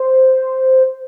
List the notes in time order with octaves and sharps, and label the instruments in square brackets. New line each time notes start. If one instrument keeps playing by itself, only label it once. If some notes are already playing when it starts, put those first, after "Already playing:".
Already playing: [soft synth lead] C5